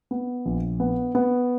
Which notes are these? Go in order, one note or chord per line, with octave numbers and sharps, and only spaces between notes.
B3
A#1
B3
B3